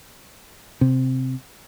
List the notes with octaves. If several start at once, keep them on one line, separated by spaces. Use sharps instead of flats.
C3